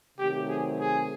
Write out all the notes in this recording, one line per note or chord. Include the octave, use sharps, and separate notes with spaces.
C3 D#3 F#3 A3 C4 G4
G#4
G#4